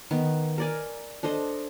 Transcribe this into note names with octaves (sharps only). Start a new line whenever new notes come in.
D#3 B3
A#4 D5 G#5
D4 A4 C5 D#5